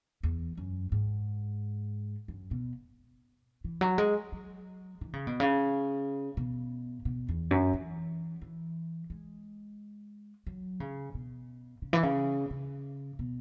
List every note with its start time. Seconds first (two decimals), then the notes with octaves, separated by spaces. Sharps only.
0.23 E2
0.57 F#2
0.92 G#2
2.28 F#2
2.51 B2
3.64 E3
3.81 F#3
3.98 G#3
4.32 F#3
5.01 E3
5.13 C#3
5.27 B2
5.40 C#3
6.37 B2
7.05 B2
7.29 E2
7.51 F#2
7.73 E3
8.42 E3
9.10 G#3
10.47 F#3
10.80 C#3
11.14 B2
11.82 C#3
11.93 E3
12.03 C#3
12.51 C#3
13.19 B2